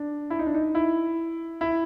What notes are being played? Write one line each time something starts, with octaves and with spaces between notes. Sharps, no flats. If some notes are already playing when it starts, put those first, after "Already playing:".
Already playing: D4
E4
D#4
D4
D#4
E4
E4